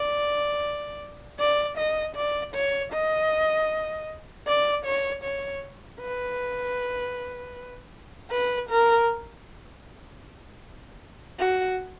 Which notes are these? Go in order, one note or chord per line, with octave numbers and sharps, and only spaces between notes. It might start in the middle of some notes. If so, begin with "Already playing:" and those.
Already playing: D5
D5
D#5
D5
C#5
D#5
D5
C#5
C#5
B4
B4
A#4
F#4